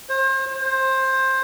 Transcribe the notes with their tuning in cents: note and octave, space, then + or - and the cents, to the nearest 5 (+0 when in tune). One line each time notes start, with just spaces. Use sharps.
C5 +35
C5 +15